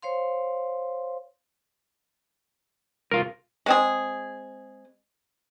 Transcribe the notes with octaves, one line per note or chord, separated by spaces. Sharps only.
C5 C#5 F5 C6
C2 F4 A#4
G#3 C4 G#4